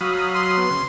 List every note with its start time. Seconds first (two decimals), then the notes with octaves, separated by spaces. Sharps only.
0.01 F#3 F5 B5 D#6
0.35 C6
0.57 B3
0.71 C#3